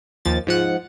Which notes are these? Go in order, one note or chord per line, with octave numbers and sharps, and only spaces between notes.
D#2 F3 A6
G#2 F3 F#5